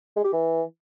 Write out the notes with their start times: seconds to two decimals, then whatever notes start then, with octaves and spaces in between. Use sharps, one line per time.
0.16 G#3
0.24 G4
0.33 E3